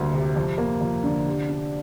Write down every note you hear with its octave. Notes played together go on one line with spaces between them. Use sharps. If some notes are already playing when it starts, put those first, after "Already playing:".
Already playing: D2 G3 A#3
C3
F2
A#3
F2
D3
C3
D4